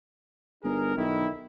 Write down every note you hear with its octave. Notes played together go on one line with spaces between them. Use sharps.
G1 D#4 G#4 A#4
B1 D3 D#3 E4